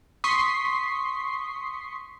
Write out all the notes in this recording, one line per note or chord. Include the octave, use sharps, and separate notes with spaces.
C6 C#6 D#6 B6 C7